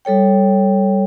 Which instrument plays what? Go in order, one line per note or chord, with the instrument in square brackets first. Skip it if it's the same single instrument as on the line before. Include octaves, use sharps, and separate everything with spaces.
[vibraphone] G3 A4 C#5 G5